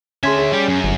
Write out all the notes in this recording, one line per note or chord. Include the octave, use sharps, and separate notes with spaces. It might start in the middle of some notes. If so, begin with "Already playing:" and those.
D3 C#4 G#4 E5 C6 G#6
G#4
G3 G4
F#2
G1